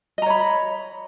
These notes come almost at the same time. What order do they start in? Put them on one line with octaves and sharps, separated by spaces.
D#5 A#5 C#5 B5